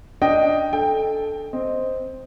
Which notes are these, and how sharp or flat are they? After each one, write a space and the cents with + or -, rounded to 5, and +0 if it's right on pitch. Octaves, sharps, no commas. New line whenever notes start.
D4 +0 D#5 +0 G5 +0
A4 -10 G5 +15
C4 +0 D#5 +0